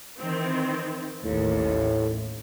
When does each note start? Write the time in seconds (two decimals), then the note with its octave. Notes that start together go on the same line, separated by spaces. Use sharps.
0.19 D#3 E3 C4
1.24 A1 D#2 A2